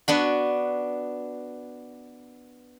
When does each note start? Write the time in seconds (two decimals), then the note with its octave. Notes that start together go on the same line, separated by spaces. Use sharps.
0.08 B3 D4 F#4